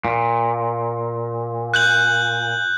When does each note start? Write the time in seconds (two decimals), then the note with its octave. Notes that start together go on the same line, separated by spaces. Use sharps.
0.05 A#2
1.74 F#6 G6 F#7